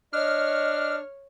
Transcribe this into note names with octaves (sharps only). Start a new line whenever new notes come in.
D4 C#5 D#5 F6